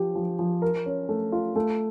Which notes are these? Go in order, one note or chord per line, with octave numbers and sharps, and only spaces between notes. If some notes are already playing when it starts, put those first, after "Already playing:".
Already playing: F3 G4
F3
F3
A#4
C#4
A3
F4
A3